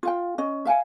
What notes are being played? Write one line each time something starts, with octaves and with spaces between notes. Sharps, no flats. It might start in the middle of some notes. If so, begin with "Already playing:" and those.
F4 F5 G5
C#4 D#5
E5 F5 G5 G#5